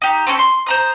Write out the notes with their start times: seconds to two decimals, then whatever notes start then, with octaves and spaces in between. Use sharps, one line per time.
0.02 D#4 G4
0.27 C4 C#4 A4
0.39 C6
0.66 C5 A#5 D#6